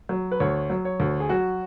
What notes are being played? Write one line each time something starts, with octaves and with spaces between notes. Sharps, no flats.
F#3
B4
D2 C#5
F#3
C#5
D2
G#4
F#3 F#4